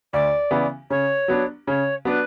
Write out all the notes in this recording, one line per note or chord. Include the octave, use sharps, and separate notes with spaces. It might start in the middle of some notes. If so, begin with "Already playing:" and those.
D2 D5
C#3 E3 B3 E4
C#3 C#5
F#3 B3 D4
C#3 C#5
F#3 B3 D4 B4